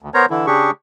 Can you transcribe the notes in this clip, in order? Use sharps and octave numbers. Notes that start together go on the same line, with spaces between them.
D2
B3 A#4 C5 C#5 A#5
D3 E3 E4
C#3 D4 G4 G#4 C#6